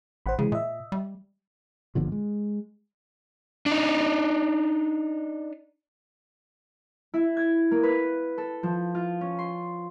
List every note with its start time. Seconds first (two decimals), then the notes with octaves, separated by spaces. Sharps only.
0.26 A1 C5 F#5 B5
0.39 C#3 E3 G#3
0.52 A#2 D#5 E5
0.92 G3
1.95 G1 A#2 D3 F3
2.12 G#3
3.66 D4 D#4
7.14 E4
7.37 G#6
7.71 A#3
7.83 B4
8.38 A4
8.63 F3
8.95 F4
9.21 C#4
9.39 C6